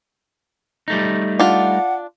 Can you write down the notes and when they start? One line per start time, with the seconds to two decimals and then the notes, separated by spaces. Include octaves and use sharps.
0.88 G3 A3 D#4
1.40 D4 F4 F#5